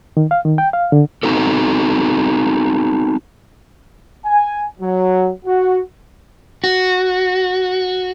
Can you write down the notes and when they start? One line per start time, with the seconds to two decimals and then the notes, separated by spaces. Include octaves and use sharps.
0.17 D#3
0.31 F5
0.45 D#3
0.58 G5
0.73 F5
0.92 D3
1.23 B3 C4 D#4 F#4 A4
4.25 G#5
4.80 F#3
5.45 F#4
6.64 F#4